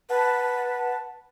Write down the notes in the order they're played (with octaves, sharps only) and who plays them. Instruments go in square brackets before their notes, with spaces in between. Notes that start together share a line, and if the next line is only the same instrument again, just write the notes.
[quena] B4 [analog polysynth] F#5 A5